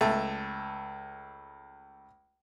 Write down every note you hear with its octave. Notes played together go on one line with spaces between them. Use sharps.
C#2 A3 A5